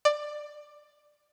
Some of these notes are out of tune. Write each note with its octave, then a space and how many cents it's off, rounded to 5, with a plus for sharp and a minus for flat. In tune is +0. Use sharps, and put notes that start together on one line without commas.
D5 +15